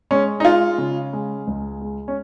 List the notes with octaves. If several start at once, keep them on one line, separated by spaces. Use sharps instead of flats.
G#3 C#4
D#4
G#3 F4
C#3
G#3
C#2
G#3
C#4